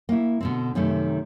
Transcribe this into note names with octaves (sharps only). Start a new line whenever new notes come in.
A#3 E4
B2 D3 C4
F#2 C3 D#3 A3